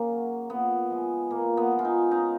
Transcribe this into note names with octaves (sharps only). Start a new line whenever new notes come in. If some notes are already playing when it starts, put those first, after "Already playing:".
Already playing: C#3 A#3
F#3
A#2 B3
F3 G#3
A#2 A#3
B3
F3 G#3
F4
D#4
C#3 D#4